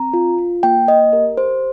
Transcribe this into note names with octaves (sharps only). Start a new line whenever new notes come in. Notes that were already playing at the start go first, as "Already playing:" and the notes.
Already playing: C4 A#5
F4
F4
A#3 G5
A#3 D#5
G4 A#4
G4 C5